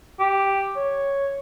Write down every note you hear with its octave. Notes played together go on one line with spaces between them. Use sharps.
G4
C#5